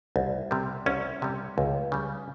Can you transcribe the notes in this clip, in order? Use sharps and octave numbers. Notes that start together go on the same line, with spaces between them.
C2
C3 G3
C2 C#4
C3 G3
C#2
C#3 G3